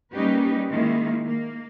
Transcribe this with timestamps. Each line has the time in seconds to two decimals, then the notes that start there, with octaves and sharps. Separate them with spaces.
0.13 G3 A#3 C#4 D#4 G4 B4
0.69 D#3 G#3 A#3 E4
1.26 A#3